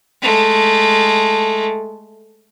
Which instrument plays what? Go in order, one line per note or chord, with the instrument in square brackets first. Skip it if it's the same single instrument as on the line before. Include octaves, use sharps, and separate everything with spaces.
[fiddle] G#3 A3